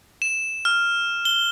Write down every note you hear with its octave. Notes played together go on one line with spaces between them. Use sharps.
E7
F6
G7